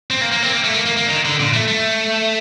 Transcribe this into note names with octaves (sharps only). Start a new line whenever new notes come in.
C4
A#3
A#3
C4
A#3
A3
A#3
A#3
A#3
D3
D#3
D3
A#2
A3
A3